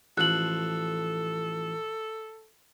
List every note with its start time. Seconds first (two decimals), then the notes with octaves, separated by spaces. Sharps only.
0.18 A1 F3 A4 F#6 F#7